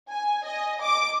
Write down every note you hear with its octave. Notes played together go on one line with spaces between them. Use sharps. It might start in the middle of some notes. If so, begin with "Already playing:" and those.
G#5
D#5
D6